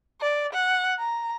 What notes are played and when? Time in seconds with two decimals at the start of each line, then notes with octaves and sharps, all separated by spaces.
0.21 D5
0.53 F#5
0.99 A#5